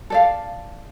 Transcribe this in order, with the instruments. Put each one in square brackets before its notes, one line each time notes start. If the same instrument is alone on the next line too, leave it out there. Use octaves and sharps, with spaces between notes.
[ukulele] A4 D5 F5